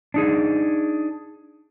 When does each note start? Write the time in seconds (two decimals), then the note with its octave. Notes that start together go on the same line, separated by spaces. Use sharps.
0.14 D4 D#4 G#4